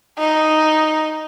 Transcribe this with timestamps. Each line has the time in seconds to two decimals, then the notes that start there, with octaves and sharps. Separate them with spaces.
0.19 D#4